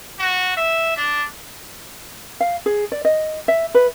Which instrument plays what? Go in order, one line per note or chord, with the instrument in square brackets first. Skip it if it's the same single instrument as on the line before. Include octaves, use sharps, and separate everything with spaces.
[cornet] F#4
E5
D4
[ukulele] F5
G#4
D5
D#5
E5
B4